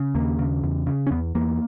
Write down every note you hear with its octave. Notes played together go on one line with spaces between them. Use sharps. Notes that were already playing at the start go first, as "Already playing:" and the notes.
Already playing: C#3
D#2 A#3
C#3
E2
C#3
C#4
E2 B3
E2 A#3